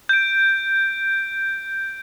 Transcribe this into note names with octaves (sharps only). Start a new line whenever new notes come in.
G6 D7